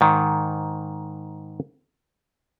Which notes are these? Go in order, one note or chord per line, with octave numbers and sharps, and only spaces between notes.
G#2 D#3